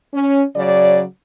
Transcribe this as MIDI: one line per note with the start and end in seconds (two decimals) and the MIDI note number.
0.14 0.43 61
0.56 1.04 49
0.56 1.04 54
0.56 1.04 74